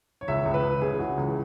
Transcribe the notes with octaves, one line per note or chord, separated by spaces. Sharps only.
C#5
C#2 E5
C#2
B4
C#2
C#3 G#4
E3 F#4
C#2